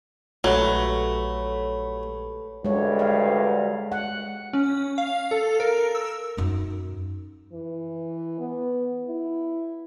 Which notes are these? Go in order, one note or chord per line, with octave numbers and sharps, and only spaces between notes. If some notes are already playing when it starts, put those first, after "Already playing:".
A#1 F#3 A3 G4 A4 B4 C#5
D2 G2 G#3 C#5
F5
F#5
C#4
F5
A4
A#4
E6
F#2 D#4
E3
B3
E4